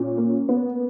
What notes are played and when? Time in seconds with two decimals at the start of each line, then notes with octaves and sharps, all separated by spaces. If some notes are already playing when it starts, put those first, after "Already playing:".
Already playing: A#2 C#4
0.17 A#3
0.49 B3